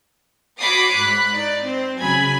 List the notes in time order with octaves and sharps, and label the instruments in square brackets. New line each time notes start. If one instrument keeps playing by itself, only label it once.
[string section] F#4 C#5 B5 D6 D#6 C7
G#2 B5 F#6
D#4 D5
C4 C5
C#3 F#3 G#5 B5 G#6